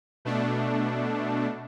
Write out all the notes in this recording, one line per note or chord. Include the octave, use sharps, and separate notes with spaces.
B2 A3 D4